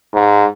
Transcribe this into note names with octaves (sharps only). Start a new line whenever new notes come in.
G#2